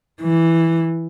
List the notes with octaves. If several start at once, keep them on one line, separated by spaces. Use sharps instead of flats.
E3